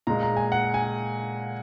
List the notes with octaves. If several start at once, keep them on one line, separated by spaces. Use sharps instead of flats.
A#2 G#3 A#5
A#5
G#5
F#5
G#5